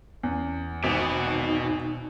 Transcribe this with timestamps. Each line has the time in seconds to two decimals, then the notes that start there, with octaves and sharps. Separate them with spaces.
0.23 E2 C#4
0.84 G#1 B2 D#4